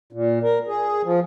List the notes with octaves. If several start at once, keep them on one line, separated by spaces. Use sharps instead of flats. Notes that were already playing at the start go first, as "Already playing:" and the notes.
A#2
A#4
G#4
F3